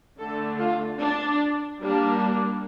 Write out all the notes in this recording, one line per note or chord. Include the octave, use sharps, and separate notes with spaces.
D3 A3 D4 A4
F4
D4
G3 A#3 D4
D4